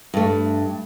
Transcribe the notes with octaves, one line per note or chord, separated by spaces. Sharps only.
G2 A3